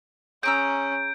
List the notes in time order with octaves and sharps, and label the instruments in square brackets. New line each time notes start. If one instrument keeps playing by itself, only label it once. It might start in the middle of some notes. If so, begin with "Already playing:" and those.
[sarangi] C#4 [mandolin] G#4 A#5 E6 [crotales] G6 D7